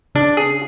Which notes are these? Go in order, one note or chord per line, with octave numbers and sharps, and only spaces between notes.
C#3 D4
G#4